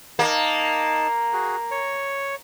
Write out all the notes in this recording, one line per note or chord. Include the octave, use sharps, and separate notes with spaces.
A#3 D#4 A5
F#4 G#4
C#5